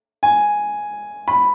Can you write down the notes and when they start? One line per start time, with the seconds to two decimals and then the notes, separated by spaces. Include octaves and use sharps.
0.23 G#5
1.28 B5